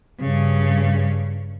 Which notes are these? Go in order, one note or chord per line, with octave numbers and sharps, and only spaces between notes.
G2 C#3